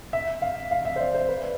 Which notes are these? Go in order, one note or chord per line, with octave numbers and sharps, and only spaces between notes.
E5
F5
F5
E5
C5
D5
C5
B4